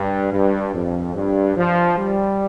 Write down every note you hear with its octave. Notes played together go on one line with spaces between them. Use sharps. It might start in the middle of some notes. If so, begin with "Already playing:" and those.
Already playing: G2
G2
F2
G2
F3
G3